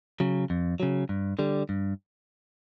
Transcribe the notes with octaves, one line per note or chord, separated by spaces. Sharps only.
C#3 F#3
F2
C#3 F#3
G2
D3 G3
G2